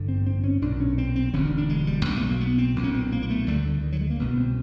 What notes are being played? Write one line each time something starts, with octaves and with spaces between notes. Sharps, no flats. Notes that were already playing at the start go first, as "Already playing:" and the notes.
Already playing: A1 G2 D3
C4
C4
C#4
B1 A#2 D4
C#4
C4
C4
E1 D2 D3 C#4
D4
D4
G#3
G3
B1 B2 A#3
A3
A#3
B3
C4
B1 A#2
C#4
C4
A#3
A#3
A3
D2 D3 G3
D3
D#3
F#3
G#3
A#3
C2 B2 B3
C4